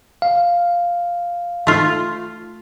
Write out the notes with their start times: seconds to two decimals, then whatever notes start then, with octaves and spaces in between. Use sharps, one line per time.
0.22 F5
1.67 A3 F4